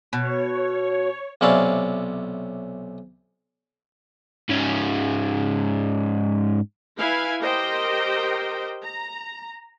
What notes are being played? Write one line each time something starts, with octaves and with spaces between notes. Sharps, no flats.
B2 C#5
B1 C3 C#4 E4 D5 F5
G#2 C#4
E4 B4 F5 G#5
G4 A#4 C5 D#5 G5
A#5